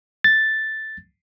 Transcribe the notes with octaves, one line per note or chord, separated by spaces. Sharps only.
A6